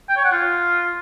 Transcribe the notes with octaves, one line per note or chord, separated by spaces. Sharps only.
G5
C#5
F#5
F4